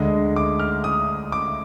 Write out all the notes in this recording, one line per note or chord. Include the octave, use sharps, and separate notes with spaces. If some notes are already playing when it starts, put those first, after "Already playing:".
Already playing: D2 D3 G#3 D#5
D6
F6
D#6
D6